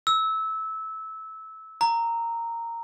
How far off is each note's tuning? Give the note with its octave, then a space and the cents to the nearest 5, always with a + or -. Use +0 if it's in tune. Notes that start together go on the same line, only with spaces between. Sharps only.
E6 -20
A#5 -10